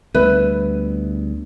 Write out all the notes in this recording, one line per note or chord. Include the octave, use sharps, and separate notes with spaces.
D2 G3 B3 B4 E5